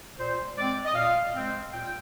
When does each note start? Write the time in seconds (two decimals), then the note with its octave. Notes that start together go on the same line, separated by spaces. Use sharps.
0.18 A#2 C5
0.56 G#3 C4 D5
0.85 D#5
0.95 A#2 F5
1.34 G#3 C4
1.72 A#2 G5